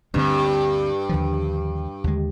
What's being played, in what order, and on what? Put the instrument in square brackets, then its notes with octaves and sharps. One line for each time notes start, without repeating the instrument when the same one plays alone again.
[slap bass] D2 D3 G3 C4 [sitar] G2
[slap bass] D#2 D3 F3
D#2 D3 G#3